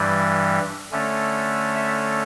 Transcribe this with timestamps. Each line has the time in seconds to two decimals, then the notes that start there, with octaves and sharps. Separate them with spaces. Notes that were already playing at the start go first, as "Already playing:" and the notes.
Already playing: G2 E3 G3
0.92 D3 A3 C#4
1.74 E5